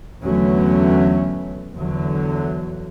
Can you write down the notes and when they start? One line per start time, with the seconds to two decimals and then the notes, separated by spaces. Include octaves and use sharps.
0.21 E2 D3 F#3 A3 B3 C#4
1.74 E2 D3 F#3